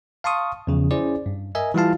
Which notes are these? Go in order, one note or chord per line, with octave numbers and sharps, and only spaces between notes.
F5 A5 C6 C#6 D#6
E2 C#3 F3
C#4 E4 G#4 C5 D5
G2
A#4 D#5 E5 G#5
E3 G3 E4 F4 F5 A5